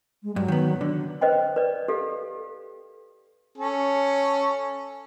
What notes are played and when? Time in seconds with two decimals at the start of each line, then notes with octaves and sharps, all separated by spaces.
0.23 G#3
0.36 G2 F#3
0.48 D#3 B3
0.81 D3
1.21 B4 C5 D#5 F#5 G5
1.56 B4 D5
1.88 G4 A4 F5
3.58 C#4 A4